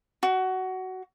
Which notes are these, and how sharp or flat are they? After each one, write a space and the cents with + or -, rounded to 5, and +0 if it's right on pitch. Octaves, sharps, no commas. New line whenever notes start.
F#4 +15